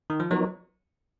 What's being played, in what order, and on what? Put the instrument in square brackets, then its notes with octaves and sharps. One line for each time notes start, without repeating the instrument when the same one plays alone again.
[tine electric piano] D#3
F3
[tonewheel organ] F3 B3 D#4 A#4 C#5 [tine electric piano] F#3